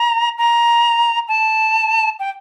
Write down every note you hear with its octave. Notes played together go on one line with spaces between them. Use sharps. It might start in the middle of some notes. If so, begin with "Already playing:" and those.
Already playing: A#5
A#5
A5
G5